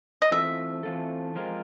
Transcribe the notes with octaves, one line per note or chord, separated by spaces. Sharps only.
D#5
E3 A3 C4 F4 A4 E5
E3 A3 C4 F4 A4
F3 G#3 C4 F4 A#4